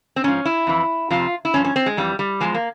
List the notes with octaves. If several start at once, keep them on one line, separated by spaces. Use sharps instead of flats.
C4
G#2 F3 C#4
E4
F2 E3
F2 C3 F3 F4
E4
G2 F3 C#4
C#4
C4
G#3
F2 E3 G3
G3
E2 C#3 F3 G#3
A#3